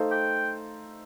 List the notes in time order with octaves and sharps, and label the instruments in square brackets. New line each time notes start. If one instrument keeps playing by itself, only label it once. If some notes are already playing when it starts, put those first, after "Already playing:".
Already playing: [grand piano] A3 D#4 A4 C5 F5
[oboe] G5